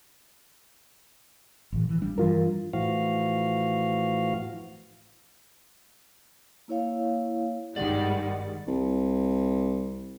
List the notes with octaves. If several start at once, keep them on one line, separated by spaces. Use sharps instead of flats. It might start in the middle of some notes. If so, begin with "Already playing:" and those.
A1 A#2 E3
E3
G3 D4
G2 E3 F4 A#4
A2 E3 F3 F#4 F5
A#3 E4 C#5 F5
G#1 G2 D#3 G3 G#3 D5 F#5
C2